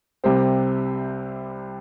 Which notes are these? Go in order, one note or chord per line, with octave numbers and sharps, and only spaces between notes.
C2 C3 G3 C4 G4